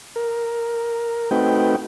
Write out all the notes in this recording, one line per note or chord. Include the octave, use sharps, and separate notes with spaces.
A#4
A3 C4 D#4 F#4 B4 G5